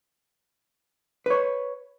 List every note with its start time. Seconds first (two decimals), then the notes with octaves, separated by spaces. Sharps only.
1.26 B4 C#5